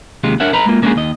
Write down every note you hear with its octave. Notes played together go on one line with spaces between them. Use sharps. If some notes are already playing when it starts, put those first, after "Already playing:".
D#2 C3 G#3 F4
D4 A#4 C#5 E5 F#5
B4 D#5 A#5 B5
G#3 A#3 F4
G#3 A#3 C#4 D4 F4 G#4
D#2 D#5